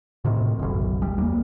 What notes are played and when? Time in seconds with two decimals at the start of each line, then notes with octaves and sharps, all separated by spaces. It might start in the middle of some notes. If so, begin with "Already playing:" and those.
0.25 A2 C3 D#3
0.59 F#1 B1
1.02 G3
1.18 B1 E2 A#3